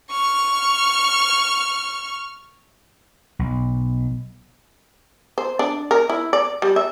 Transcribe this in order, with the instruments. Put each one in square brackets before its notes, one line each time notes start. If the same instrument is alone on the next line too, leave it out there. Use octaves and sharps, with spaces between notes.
[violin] C#6 F6
[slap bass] B1
[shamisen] C5
D4
A#4
E4
D5
G3
E5